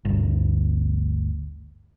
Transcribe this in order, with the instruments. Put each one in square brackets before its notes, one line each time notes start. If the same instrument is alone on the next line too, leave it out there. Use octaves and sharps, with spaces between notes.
[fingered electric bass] G1 D2